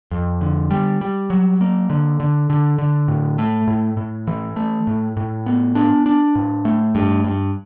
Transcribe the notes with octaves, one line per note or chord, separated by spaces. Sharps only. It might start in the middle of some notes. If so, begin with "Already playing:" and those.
F2
D3
G3
G3
F#3
A#3
D3
D3
D3
D3
A2
A3
A2
A2
E3
A3
A2
A2
B3
D4
D4
A2
A3
G2
G2